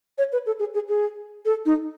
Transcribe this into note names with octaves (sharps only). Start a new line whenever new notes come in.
C#5
B4
A4
G#4
G#4
G#4
A4
D#4